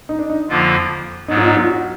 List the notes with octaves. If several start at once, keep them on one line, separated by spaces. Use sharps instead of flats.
D#4
D4
D#4
F2 D3 F3 A#3 F4
G#2 F#3 B3 D#4
F4
D#4
F4
F#4